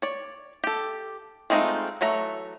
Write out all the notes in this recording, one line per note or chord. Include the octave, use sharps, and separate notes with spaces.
C#5 D5
G4 A4
G#3 A3 C4 D#4 F4
E3 F#3 A3 A#5